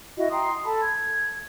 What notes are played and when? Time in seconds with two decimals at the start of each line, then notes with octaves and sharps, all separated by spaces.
0.17 E4 F#4 D#5
0.30 G5 A#5 C6 D#6
0.64 A4 A5 B5
0.82 G#6